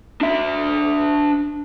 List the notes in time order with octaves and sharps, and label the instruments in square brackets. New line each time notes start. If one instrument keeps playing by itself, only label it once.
[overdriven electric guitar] D4 E5